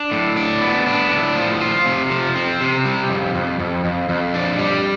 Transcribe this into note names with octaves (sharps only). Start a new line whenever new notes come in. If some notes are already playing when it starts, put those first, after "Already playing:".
Already playing: D4
A2
D4
B3
D4
A2
F3
F4
C3
F3
C4
C3
G3
F2
F2
F2
F2
F2
D4
G3